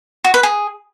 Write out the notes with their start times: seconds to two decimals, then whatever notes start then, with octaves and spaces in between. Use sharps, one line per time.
0.24 F#4
0.34 B4
0.43 G#4